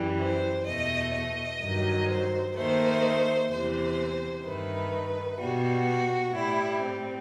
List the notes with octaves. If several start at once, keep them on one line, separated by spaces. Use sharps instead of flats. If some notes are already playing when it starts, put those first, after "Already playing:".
Already playing: F#2 E3 G3
C5
E2 B2 A3 D#5
D#5
G2 D#3 F#3
C5
D#2 D#3 A3 C5
E2 C3 E3 C5
G2 D#3 A3 B4
B2 G3 F#4
A2 G3 E4
C4